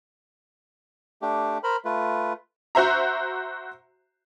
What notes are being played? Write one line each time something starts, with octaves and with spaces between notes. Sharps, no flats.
A3 D4 G4
A#4 C5 B5
A3 F4 B4
F#4 C5 E5 A#5